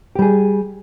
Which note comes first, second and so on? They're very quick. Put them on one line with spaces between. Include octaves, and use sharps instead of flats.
G4 G3 G#4